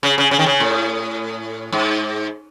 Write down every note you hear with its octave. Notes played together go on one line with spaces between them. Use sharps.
C#3
C#3
C#3
D#3
C#3
A2
G#2